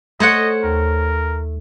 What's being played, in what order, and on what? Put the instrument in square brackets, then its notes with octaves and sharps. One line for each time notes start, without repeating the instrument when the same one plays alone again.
[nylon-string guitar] A3 [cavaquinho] C5 C#5 F#5 [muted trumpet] D#5
[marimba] D#2 [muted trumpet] A#4